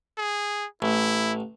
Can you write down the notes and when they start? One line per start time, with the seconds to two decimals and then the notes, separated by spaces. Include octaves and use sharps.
0.18 G#4
0.82 A1 E4